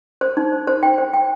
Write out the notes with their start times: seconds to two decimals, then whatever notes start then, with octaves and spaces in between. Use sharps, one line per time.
0.21 C5
0.37 D#4
0.52 C5
0.67 C5
0.83 G5
0.98 C5
1.13 G5